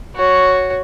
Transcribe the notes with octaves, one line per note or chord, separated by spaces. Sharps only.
F#4 C#5